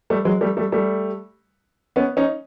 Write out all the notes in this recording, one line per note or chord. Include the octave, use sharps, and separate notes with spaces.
G3 A3
F#3 G#3
G3 A3
G3 A3
G3 A3
B3 C#4
C#4 D#4